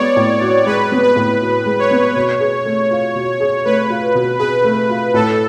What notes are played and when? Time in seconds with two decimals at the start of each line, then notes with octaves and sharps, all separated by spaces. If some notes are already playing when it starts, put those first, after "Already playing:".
Already playing: G#3 B3 C#5 D5
0.17 A2
0.41 F#4
0.66 G#3 B4
0.92 B3
1.03 B4
1.16 A2
1.42 F#4
1.66 G#3
1.79 C#5
1.91 B3
2.16 B2
2.41 G#4
2.66 A3
2.91 F4
3.15 B2
3.40 G#4
3.65 A3 B4
3.90 F4
4.15 B2
4.39 G#4 B4
4.64 A3
4.90 F4
5.14 A2 A4